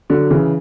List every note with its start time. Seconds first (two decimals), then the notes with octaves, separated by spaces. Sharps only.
0.10 D3 F#3
0.30 C#3 E3